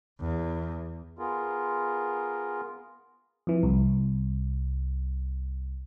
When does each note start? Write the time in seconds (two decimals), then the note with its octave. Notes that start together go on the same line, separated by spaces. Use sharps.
0.20 E2
1.19 B3 F4 G#4 A#4
3.47 F2 E3
3.63 C2